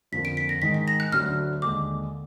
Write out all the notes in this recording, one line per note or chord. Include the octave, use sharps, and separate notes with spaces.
F2 D3 F3 A#3 F4 B6
D7
B6
A#6
G#2 D#3 G#3 D#4 B6
B6
A#6
F#6
D2 D3 F#3 D4 F6
D#2 D3 G#3 D6